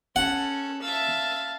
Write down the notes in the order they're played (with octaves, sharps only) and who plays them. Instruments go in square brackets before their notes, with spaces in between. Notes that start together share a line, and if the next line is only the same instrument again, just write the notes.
[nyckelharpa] C#4 [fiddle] A4 [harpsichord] F#5
[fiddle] E5 E6 [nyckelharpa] F5 A5